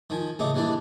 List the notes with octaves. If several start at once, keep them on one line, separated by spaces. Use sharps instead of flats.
D#3 F3 G#5
A1 C#3 A3 D#4 D6
D#2 E3 G3 D4